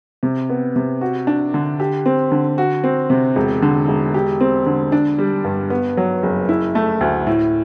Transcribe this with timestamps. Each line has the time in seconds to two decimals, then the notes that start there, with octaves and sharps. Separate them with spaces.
0.23 C3
0.50 B3
0.76 C3
1.01 F#4
1.27 D4
1.54 D3
1.80 G4
2.06 C4
2.32 D3
2.58 F#4
2.84 C4
3.10 C3
3.36 E1
3.62 D3
3.88 E1
4.14 G4
4.41 C4
4.66 D3
4.92 D4
5.19 G3
5.44 G2
5.70 B3
5.97 F#3
6.23 F#1
6.49 E4
6.75 A3
7.01 D2
7.27 A2